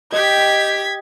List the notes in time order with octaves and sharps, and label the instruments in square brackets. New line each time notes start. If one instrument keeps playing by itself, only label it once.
[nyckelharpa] G4 G5 [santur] D#5 [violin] G#6 B6